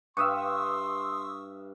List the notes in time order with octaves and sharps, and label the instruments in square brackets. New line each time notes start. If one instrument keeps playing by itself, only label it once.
[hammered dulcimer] G2 E5 F5 [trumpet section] C6 [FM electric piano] C#6 D#6 E6